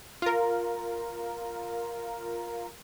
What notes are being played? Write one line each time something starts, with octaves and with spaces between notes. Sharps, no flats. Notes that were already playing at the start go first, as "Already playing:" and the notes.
F4 A#4